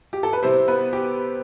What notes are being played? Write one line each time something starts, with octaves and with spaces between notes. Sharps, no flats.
G4
A4
B4
C3 G3 C4 E4 C5
B3 B4
G4